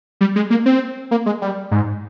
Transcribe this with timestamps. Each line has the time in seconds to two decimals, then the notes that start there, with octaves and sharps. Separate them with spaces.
0.21 G3
0.36 G#3
0.50 A#3
0.66 C4
1.11 A#3
1.26 G#3
1.42 G3
1.71 G#2